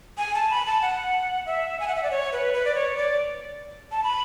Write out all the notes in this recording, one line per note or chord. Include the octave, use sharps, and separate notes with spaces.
G#5
A5
B5
A5
F#5
E5
G#5
F#5
E5
D5
C#5
B4
B4
D5
C#5
D5
A5
B5